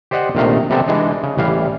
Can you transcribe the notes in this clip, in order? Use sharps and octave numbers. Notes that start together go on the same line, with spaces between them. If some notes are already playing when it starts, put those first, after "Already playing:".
G4 C5 D5 D#5 F#5
A#1 C3 D#3 A3 F5 A#5
C3 G3 B3 C4 A4
E3 G#3 D4 D#4
C#3
A1 E3 G3 F5